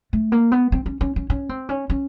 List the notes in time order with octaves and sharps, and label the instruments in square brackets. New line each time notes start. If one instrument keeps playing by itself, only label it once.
[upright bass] A3
A#3
B3
C4
C#4
C#4
C#4
C#4
C4
C#4
C#4